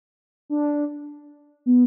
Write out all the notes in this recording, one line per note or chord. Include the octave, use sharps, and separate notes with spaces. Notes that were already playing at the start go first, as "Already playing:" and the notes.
D4
B3